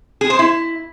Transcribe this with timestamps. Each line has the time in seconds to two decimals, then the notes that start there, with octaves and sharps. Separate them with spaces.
0.21 G#4
0.30 C5
0.39 E4